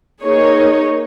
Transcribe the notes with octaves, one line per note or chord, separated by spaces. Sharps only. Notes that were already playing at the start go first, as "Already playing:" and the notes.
A#3 D#4 G#4 C#5